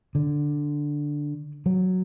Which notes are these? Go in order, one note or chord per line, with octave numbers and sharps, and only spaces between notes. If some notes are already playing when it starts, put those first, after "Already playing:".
D3
F#3